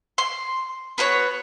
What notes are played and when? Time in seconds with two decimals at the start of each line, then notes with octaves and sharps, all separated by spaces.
0.18 C6
0.98 B3 F#4 A#4 C#5